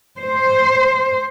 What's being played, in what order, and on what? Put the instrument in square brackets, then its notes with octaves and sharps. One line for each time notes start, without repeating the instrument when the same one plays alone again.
[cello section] C5